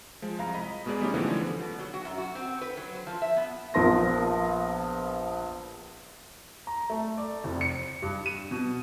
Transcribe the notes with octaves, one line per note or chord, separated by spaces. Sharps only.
F3 G#3
C2 F5 A#5
D#5 B5
B2 G#3 B3 G#4 D5
G3 A3 B3 C#4 D#4 G4
D3 E3 F3 A3 B3 D4
B2
F#3
F#4
F#2
F#4
C4
B4
F#3
C5
F3
E5
B3
A#1 F3 B3 A#4 C6 A#6
A#5
A3
D5
F1
C#7
G2
D#7
B2